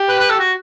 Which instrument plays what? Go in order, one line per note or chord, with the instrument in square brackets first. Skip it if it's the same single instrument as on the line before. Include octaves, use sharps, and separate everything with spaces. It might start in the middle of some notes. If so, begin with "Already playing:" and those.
Already playing: [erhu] G4
[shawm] B4
B4
A4
F#4